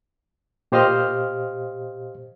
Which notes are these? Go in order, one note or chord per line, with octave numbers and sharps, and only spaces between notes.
A#2 G4 C5 D#5 F5 F6